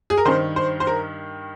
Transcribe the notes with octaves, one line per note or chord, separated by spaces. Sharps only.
G#4
A#4
G2 D#3 C5
C5
C5
A#4